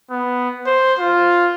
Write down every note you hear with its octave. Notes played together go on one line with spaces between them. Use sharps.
B3
C5
F4